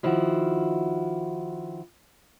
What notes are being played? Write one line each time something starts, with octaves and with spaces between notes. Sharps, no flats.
D#3 F3 E4 F#4